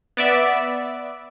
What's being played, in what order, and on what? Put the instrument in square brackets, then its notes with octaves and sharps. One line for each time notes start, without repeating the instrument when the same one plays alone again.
[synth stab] B3 D5 E5